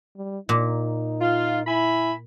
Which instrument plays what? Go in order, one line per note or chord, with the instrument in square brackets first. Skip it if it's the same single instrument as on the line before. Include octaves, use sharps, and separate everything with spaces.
[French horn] G3
[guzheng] A#2 [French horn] D#4
[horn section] F4
[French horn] E4 [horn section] E5 G#5 B5